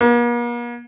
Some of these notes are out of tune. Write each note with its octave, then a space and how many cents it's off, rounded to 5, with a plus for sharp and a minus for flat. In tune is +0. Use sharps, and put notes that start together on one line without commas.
A#3 +45